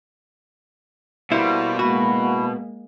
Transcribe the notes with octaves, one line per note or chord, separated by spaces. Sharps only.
B2 G3 A#3 E4 C5
G#3 A#3 E4 F#4